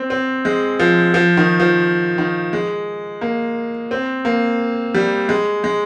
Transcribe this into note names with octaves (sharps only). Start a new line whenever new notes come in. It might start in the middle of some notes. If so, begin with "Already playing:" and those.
Already playing: C4
C4
G#3
F3
F3
D#3
F3
D#3
G#3
A#3
C4
A#3
G3
G#3
G#3